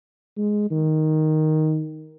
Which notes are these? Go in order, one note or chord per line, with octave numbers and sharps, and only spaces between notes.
G#3
D#3